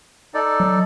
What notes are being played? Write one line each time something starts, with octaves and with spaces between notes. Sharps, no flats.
D#4 A4 D5
F#3